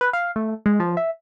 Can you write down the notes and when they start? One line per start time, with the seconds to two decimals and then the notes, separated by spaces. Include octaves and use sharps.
0.01 B4
0.13 F5
0.36 A3
0.66 G#3
0.80 F3
0.97 E5